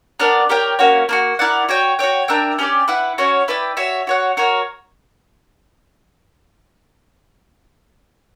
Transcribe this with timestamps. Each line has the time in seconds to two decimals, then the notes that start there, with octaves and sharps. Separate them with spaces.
0.20 B3 D4 A#4 D5
0.49 G4 A#4 C#5 G5
0.79 A#3 C#4 F#4 C#5
1.09 A#3 D4 F#4
1.39 E4 A#4 D5 F#5
1.69 F#4 C#5 G5
1.99 F#4 C#5 G5
2.28 D4 A#4 E5 G5
2.59 C#4 G4 B4 D5
2.88 E4 B4 F#5
3.18 C#4 F#4 C#5
3.48 E4 B4 D5 G5
3.77 F#4 C#5 E5
4.07 F#4 C#5 F#5
4.37 F#4 A#4 C#5